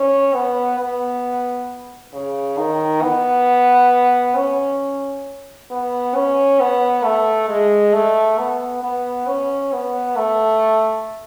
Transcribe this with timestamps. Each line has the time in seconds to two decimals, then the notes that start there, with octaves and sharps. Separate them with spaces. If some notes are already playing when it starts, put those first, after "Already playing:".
Already playing: C#4
0.35 B3
0.79 B3
2.13 C#3
2.58 D#3
3.02 B3
4.36 C#4
5.71 B3
6.15 C#4
6.60 B3
7.04 A3
7.49 G#3
7.94 A3
8.38 B3
8.83 B3
9.27 C#4
9.73 B3
10.17 A3